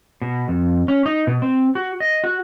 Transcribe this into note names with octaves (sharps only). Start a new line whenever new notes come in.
B2
F2
C#4
D#4
B2
C4
F#4
D#5
F#4